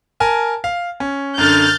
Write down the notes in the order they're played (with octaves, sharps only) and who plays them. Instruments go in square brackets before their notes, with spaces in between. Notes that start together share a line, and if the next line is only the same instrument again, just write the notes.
[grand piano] A#4 G#5 A5
F5
C#4
[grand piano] F#2 D3 [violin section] F6 G6 A6